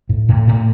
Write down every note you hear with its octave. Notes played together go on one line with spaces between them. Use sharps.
A2
A2
A2